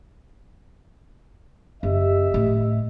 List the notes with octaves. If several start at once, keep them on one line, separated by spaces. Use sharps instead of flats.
F#1 G4 D#5 E5
A2